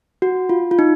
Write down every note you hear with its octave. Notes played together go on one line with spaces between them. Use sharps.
F#4
F4
F4
D#4